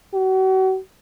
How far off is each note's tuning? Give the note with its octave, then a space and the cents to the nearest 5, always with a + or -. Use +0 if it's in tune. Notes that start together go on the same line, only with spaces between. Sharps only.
F#4 +35